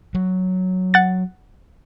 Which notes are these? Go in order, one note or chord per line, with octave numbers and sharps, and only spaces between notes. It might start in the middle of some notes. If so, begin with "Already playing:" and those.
F#3
F#5 A6